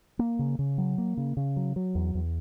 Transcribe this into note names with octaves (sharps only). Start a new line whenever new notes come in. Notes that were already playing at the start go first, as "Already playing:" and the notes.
A#3
C#3
C#3
F#3
A#3
C#3
C#3
F#3
F#3
E2
E2